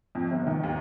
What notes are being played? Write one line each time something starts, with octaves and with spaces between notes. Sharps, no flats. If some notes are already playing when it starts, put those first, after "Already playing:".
F2
G1
D#3
D#2